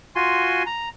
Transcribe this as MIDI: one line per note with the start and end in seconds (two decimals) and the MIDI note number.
0.16 0.63 65
0.16 0.63 66
0.16 0.63 80
0.16 0.63 84
0.66 0.89 82